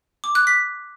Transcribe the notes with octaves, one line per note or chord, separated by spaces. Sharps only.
D6
F#6
B6